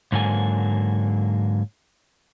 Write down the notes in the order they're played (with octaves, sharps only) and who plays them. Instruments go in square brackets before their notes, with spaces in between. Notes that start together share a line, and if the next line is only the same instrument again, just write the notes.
[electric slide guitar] G#2 D3 F#3 A#3 G#5